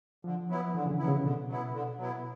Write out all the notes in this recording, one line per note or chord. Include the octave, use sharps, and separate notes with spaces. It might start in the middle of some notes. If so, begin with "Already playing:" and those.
D3 F3
F#3 B3 E4
D3 E3
C#3
D3
F#3 B3 E4
C#3
B2 D3
F#3 B3 E4
D3
F#3 B3 E4